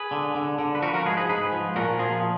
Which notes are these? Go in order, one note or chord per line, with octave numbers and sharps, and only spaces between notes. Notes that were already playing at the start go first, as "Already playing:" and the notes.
Already playing: G#4 B4
D3
D3
D3
B4
F3 F#4 A#4
B4
F#4 A#4
G#2 G#4 B4
G#4 B4
G#2 G#4 B4
F3
A#2 F#4 A#4
F3 F4 G#4